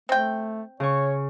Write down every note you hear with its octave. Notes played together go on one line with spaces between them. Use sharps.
A3 C4 G5
C#3 C#5 C#6